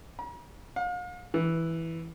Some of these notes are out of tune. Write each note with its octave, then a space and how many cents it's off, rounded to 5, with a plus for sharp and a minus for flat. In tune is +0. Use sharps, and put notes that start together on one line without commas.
A#5 +45
F5 +40
E3 -5